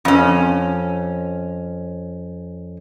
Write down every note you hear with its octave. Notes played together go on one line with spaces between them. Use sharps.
F2 C#4